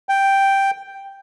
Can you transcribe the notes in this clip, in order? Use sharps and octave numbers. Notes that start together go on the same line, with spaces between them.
G5